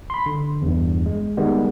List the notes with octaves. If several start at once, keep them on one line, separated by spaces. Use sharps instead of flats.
B5 C6
D3
E2 G2
G#3
D#3 G3 G#3 B3